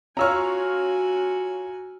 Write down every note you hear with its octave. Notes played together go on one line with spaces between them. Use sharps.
C#4 F4 F#4 C#5 G#5 A#5 E6 F6